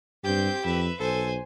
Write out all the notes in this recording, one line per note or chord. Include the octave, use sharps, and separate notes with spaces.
G2 C4 G4 G6
F2 B4 E5
B1 A4 C5 G#5